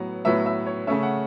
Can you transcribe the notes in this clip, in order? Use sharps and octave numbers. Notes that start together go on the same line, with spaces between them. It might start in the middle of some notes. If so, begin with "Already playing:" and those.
Already playing: A2 F#3 B3
A2 F#3 B3 E5
E5
C#5
C#3 A3 C#4 E5
F#5